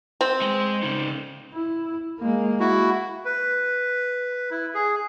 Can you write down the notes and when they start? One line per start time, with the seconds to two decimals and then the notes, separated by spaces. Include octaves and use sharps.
0.21 C4
0.41 G#3 G#5
0.83 C#3 D#4
1.54 E4
2.20 G#3 A#3
2.60 E4 F#4
3.25 B4
4.51 E4
4.75 G#4